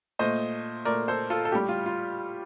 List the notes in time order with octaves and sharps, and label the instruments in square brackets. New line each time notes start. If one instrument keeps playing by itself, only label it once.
[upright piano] A#2 A3 C5 D#5
A#2 A3 A#4 D5
A4 C5
F4 A4
A4
A2 G3 G4
F4
F4